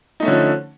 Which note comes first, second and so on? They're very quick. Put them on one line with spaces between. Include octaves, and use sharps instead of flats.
D#4 A3 C#4 D3 F3